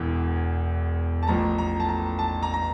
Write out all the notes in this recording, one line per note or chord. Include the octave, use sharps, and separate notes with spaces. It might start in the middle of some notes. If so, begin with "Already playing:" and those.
Already playing: E1 E2 E3
A5
A1 A2 F3 A#5
A#5
A5
A#5
A5
A#5
A#5